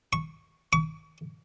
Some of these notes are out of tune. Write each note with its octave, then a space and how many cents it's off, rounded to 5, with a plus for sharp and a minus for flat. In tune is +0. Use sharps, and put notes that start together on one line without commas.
C#6 -5
C#6 +35